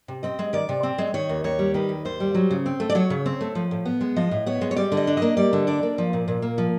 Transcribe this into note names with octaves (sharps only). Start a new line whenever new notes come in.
C3
C4 D#5
G#3
D#3 D5
C3
C4
G#3
D#3 C#5
D#2
D#2 C#5
G3
D#3 B4
D#2
D#2 C5
G3
F#3
C#3
C4
A3
D5
F#3 C#5
C#3
C4
A3
F3
A2
B3
G#3
F3 D#5
A2
B3 C#5
G#3
C#5
G3 D5
D3
D#5
D4
A#3 D#5
G3 D5
D3
D4 D5
A#3
F3
A#2
A#2
A#3
F3